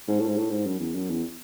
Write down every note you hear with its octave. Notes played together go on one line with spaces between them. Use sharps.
G#2
A2
G#2
A2
G#2
F#2
E2
F#2
E2